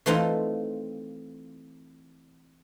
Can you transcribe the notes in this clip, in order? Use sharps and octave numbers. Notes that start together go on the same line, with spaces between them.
E3 A3 C4 D#4 F4